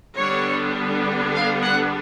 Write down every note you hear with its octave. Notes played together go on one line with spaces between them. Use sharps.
D3 G3 B3 D4 C#5
F5
F#5